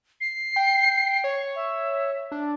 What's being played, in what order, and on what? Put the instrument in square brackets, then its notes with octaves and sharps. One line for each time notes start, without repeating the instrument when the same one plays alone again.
[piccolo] C7
[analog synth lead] G5
C#5
[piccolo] E5
[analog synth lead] D4